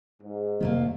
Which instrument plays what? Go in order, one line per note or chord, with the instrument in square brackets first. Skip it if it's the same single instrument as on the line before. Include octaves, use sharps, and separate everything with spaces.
[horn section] G#2
[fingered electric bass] F2 C3 G3 [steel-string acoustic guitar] D#3 A3 A#3